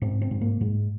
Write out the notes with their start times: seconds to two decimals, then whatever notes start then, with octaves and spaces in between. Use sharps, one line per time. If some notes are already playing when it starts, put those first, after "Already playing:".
0.02 G#2 C4
0.22 C4
0.31 G#2
0.41 A#3
0.61 G#2 G#3